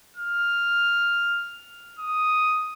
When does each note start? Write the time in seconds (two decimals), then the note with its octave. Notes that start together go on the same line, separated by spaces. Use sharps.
0.17 F6
1.99 D#6